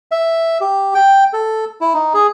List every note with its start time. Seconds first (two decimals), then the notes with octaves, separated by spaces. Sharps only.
0.11 E5
0.61 G4
0.94 G5
1.33 A4
1.81 E4
1.94 D#4
2.14 G#4